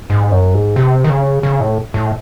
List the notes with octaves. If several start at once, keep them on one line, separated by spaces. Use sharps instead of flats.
G#2
F#2
G#2
C3
D#3
C#3
C#3
A2
A2